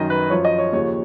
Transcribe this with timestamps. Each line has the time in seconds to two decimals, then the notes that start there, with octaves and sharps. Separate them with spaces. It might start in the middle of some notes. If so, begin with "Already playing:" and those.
Already playing: F#2 D#3 D#5
0.10 B4
0.30 F#2 F3 C#5
0.45 D#5
0.58 C#5
0.73 D#2 C#3 F3 C#5